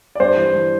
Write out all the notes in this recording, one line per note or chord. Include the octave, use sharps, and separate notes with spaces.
D5
G2 C5
E3
E3